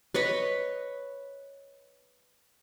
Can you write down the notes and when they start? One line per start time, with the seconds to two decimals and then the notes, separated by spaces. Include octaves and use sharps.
0.14 B4 C#5 D#5 B5